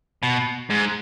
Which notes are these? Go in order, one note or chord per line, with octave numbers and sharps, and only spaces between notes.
B2
G#2